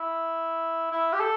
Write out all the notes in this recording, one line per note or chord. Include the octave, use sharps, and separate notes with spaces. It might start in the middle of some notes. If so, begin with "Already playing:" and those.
Already playing: E4
E4
G4
A4